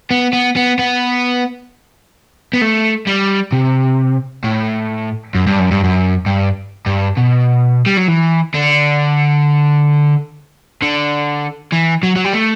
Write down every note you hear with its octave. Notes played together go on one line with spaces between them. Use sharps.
B3
B3
B3
B3
B3
A3
G3
C3
A2
F#2
G2
F#2
G2
F#2
G2
G2
B2
G3
F#3
E3
D3
D3
E3
F#3
F#3
G3
A3